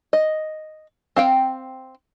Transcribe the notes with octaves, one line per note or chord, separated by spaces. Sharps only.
D#5
C4 F5 G5